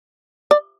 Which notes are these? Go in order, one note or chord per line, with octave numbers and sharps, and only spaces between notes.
D5